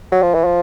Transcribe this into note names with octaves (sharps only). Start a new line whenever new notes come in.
F#3
F3
E3
F3